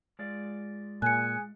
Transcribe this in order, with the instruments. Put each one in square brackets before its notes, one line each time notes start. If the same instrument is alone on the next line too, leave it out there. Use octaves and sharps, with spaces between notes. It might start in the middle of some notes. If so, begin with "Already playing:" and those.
[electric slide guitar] G#3 F4 D5
[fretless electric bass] A#2 [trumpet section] G#4 G#5 [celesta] F#6 C#7